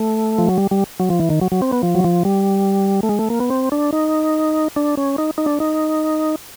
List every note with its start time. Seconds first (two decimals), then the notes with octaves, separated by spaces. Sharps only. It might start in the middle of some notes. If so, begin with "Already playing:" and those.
Already playing: A3
0.38 F3
0.48 F#3
0.58 G3
0.71 G3
1.00 F#3
1.10 F3
1.20 E3
1.30 D#3
1.41 F#3
1.52 F#3
1.62 C4
1.72 B3
1.83 F3
1.95 F#3
2.04 F3
2.25 G3
3.03 A3
3.09 G#3
3.19 A3
3.30 A#3
3.40 B3
3.50 C4
3.72 D4
3.93 D#4
4.76 D4
4.97 C#4
5.18 D#4
5.38 D#4
5.46 D4
5.60 D#4